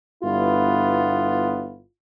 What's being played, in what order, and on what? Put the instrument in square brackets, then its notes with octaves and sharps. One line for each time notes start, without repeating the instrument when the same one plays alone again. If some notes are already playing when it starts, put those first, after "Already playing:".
[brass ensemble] G1 G2 B3 E4 F4